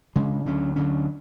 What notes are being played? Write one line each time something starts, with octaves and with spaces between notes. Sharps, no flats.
C#3 G#3 D4
D2 D3 F#3 C#4
D2 D3 F#3 C#4